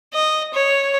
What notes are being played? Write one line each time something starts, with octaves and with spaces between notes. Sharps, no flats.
D#5
C#5